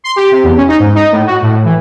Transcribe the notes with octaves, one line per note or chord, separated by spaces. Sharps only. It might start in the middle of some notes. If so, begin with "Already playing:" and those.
C6
G4
C3
E2
C#4
D#4
G#2
D#4
A2
F#4
A2
E3